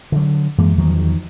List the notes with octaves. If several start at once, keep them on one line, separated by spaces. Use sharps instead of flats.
D3 F#3
F#2 E3 G#3 A#3
E2 D#3 F3 F#3